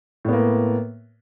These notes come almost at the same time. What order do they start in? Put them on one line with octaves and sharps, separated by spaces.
A2 B3 A#3